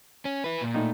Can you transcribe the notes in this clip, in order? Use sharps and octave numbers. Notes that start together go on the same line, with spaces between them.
C#4
E4 B4
A#2
A2 D#4